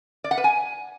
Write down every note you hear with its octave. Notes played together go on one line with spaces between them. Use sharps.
D5
F#5
B4
G#5